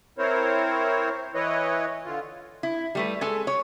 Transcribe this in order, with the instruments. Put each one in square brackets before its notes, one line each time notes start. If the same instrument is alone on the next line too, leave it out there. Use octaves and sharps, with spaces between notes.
[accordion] C4 E4 A#4 C5 C#5
E3 E4 B4 C#5 D#5
D3 F4
[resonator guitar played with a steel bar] E4
G3 A3 B4
G#3 A4 G#5
C#5